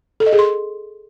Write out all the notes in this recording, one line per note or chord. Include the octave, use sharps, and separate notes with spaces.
A4
D#5
G#4
C6